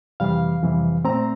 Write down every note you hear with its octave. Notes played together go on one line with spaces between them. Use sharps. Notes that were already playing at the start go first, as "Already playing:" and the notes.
F2 C3 E3 G3 F5
F2 C3 E3 G3
A#2 A3 C4 A#5